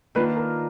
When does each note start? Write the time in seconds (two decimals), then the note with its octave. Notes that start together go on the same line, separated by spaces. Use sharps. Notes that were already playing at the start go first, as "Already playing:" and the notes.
0.15 D#3 A#3 D4 F4 B4
0.37 A#4